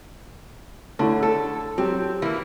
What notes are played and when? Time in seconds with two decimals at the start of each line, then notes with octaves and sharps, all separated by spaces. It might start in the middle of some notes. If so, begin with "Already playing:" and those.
0.99 D3 A3 C#4 E4
1.23 A4
1.78 F#3 C4 G4
2.22 E3 A#3 E4